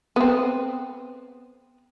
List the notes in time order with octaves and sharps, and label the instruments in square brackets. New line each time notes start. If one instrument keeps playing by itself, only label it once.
[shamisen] B3 C4